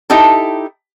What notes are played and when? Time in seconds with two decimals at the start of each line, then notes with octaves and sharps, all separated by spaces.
0.10 D#4 E4 G4 A4